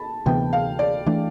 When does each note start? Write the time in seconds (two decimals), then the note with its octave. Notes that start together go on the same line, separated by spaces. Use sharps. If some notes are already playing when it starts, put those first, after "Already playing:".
Already playing: A5 B5
0.26 D2 C3 E3 B3 G5
0.53 F5
0.79 D5
1.06 E3 A3 D4